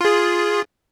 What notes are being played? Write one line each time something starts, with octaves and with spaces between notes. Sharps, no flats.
F4 G#4